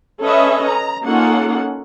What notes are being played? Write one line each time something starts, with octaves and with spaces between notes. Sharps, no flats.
C#4 A4 B4 D#5 E5
A#5
A#3 C#4 D#4 F4 A4 F#5